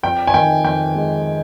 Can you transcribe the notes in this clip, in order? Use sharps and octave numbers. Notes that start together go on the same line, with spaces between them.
F2 G5
G#5
D#3 G5
F2 G5
G#3